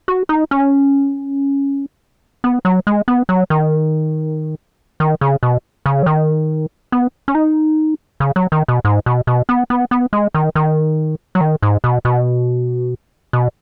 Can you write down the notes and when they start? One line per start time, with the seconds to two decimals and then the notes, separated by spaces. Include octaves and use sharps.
0.08 F#4
0.29 D#4
0.51 C#4
2.44 B3
2.65 F#3
2.87 G#3
3.08 B3
3.29 F#3
3.50 D#3
5.00 D#3
5.21 C#3
5.43 B2
5.86 C#3
6.03 F#3
6.06 D#3
6.92 B3
7.28 C#4
7.35 D#4
8.20 C#3
8.36 F#3
8.52 D#3
8.68 B2
8.85 G#2
9.06 B2
9.27 B2
9.49 B3
9.70 B3
9.91 B3
10.13 G#3
10.35 D#3
10.55 D#3
11.35 F#3
11.41 D#3
11.62 G#2
11.84 B2
12.05 B2
13.33 B2